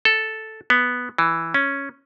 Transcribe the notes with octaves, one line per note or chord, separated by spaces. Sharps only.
A4
B3
E3
C#4